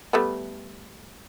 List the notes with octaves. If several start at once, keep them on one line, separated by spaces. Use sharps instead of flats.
G3 A3 B3